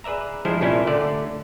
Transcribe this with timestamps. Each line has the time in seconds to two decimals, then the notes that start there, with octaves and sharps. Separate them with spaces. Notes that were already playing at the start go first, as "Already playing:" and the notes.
0.04 G#4 B4 D5 E5 A#5
0.45 F3 G3 G#3 D4 E4 C5
0.61 C2 A#2 C#4 E4 G4 C5
0.87 D3 A3 D5